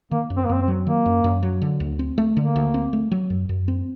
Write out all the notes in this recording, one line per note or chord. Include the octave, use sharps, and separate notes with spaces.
D#3 A#3
F#2
C4
A#3
F#2 C4
C4
F#3
D#3 A#3
F#2
F#2
F#3
D3
D2
C4
A3
D3 A#3
D2
C4
A3
F#3
F#2
F#2
C4